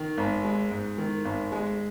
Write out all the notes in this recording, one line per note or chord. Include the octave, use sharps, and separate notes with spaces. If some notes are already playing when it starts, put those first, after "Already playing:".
Already playing: D#3
G#1
G#3
G#2
D#3
G#1
G#3